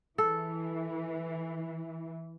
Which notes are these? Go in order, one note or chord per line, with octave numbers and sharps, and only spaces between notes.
E3 A4